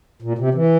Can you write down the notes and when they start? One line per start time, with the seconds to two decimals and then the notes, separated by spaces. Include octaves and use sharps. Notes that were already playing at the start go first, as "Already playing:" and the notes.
0.22 A#2
0.38 C3
0.55 E3